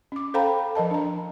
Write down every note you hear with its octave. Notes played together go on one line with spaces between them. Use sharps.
C#4 D6
A4 C5 F5 G5 A#5 B5
F3 A#4 D#5 A5
D4 A#5